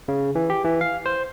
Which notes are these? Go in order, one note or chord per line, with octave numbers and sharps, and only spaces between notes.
C#3
E3
G4
E3
F5
C5